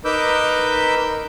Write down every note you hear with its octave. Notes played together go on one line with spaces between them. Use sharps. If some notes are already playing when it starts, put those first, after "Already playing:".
D#4 A#4 B4 D6 E6 G6